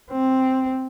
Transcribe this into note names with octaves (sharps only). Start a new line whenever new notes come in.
C4